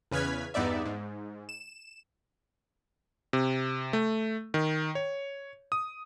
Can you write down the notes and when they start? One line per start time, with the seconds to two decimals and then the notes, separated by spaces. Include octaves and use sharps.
0.11 E2 C#3 B4 F6 G#6 B6
0.54 E2 G2 B3 D#4 D5 E5
0.85 G#2
1.49 E7
3.33 C3
3.93 A3
4.54 D#3
4.95 C#5
5.72 D#6